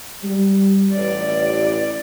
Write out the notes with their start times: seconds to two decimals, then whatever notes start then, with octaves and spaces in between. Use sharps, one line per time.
0.23 G3
0.93 A1 D5